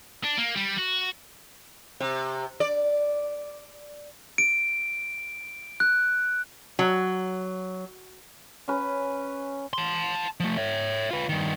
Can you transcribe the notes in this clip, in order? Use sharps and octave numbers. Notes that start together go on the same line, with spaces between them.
D4
A#3
G3
F#4
C3
D5
D7
F#6
F#3
C#4 B4
A5 C6
F3 A3
C#5 E5
F4 B4
G2 D#3